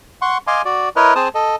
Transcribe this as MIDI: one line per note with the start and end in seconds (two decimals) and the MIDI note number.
0.22 0.38 78
0.22 0.38 84
0.22 0.38 85
0.47 0.62 75
0.47 0.62 77
0.47 0.62 80
0.47 0.62 84
0.47 0.62 86
0.65 0.89 66
0.65 0.89 74
0.96 1.14 64
0.96 1.14 70
0.96 1.14 71
0.96 1.14 73
0.96 1.14 75
1.15 1.28 60
1.15 1.28 68
1.15 1.28 72
1.15 1.28 81
1.15 1.28 87
1.35 1.56 69
1.35 1.56 75